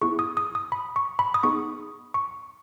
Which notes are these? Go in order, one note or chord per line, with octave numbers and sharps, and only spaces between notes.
B3 E4 G#4 C#6
D#6
D#6
D#6
B5
C#6
B5
D#6
B3 D#4 G#4 C#6
C#6